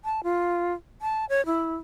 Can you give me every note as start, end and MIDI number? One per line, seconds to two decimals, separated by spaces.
0.05 0.21 81
0.24 0.73 65
1.01 1.25 81
1.29 1.44 73
1.46 1.75 64